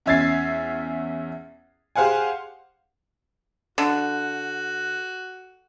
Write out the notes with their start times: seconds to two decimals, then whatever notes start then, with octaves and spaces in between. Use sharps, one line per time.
0.06 E2 C#4 E5 G#6 A6 C7
1.96 G4 G#4 C5 F5 F#5 G#5
3.78 D3 F#4